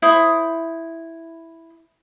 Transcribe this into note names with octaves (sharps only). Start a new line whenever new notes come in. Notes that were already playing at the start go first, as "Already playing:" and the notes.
E4 C5 D#6